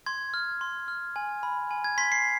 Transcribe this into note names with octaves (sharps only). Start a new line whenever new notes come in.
C6 G#6
F6
C6
F6
G#5
B5
G#5
G#6
C6 B6
C7